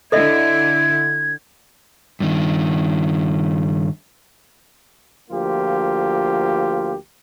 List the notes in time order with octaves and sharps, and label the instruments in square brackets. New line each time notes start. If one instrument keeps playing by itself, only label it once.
[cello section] D3 E4 [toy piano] A4 D#5 E5 [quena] G#6
[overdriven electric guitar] G2 D#3
[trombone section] D2 F3 A#3 F4 G4